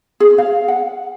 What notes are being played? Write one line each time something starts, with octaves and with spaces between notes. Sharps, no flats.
G#4
F5
F#5